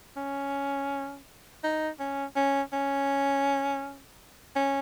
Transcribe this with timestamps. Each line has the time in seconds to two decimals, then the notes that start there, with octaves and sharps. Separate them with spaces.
0.17 C#4
1.63 D#4
2.00 C#4
2.36 C#4
2.73 C#4
4.56 C#4